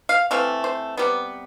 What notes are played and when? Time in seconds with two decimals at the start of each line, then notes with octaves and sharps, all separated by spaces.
0.09 F5
0.31 E3 A3 C4 F5
0.64 C5
0.97 C3 G3 B3